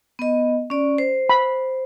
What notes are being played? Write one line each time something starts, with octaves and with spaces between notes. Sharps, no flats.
B3 D#5
C#4 D5
C5
B5